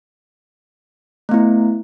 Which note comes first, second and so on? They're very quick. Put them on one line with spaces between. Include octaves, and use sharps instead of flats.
A3 B3 E4